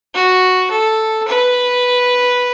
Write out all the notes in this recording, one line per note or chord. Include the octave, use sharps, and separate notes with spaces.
F#4
A4
B4